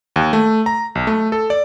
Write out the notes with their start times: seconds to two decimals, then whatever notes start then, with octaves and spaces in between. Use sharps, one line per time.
0.16 D#2
0.33 A3
0.66 A#5
0.95 B1
1.07 A3
1.32 A4
1.50 D5